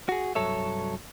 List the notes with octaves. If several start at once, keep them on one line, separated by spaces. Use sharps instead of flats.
F#4 G#4
C2 G2 F#3 A4 C#5 E5